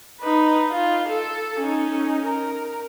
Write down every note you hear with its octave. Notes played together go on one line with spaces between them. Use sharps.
D#4 B4
F4
A4
C#4 D#4
A#4